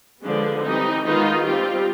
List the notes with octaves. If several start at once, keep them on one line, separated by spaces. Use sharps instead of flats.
D3 F3 G#3 B3 D4
E3 G3 C4 D#4
D#3 G#3 B3 D#4 F4
G3 C4 F4 G4